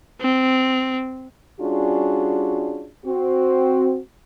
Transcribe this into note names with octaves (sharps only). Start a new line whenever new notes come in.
C4
G3 C#4 D4 F4 F#4 G#4
C4 F#4